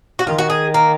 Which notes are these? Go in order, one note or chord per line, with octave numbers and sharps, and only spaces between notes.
F#4
D#3 F4
F#4
G#4
A#3